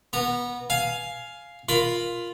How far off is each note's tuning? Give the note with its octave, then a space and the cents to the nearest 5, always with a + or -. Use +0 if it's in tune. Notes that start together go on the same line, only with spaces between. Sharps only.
B3 -20 A#5 -15
F5 +0 G#5 +15
F4 +0 A#4 +0 B5 +25